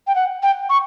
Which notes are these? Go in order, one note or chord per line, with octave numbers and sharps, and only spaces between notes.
G5
F#5
G5
C#6